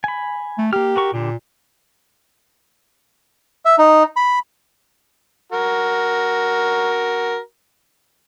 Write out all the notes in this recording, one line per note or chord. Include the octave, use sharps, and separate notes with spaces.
G#5 B5
A3
A#3 G4 F6
F#4 A#4 C#6
A#2 D3 G4
E5
D#4
B5
F#4 A#4